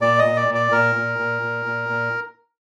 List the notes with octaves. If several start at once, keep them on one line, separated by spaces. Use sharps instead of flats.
A#2 D5
D#5
A#2
D5
A#2
D5
A#2 A#4
A#2
A#2
A#2
A#2
A#2